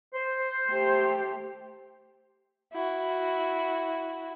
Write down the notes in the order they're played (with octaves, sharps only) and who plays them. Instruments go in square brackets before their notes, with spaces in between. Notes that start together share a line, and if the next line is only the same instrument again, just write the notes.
[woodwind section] C5
[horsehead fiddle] A3 G4
[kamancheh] E4 F#4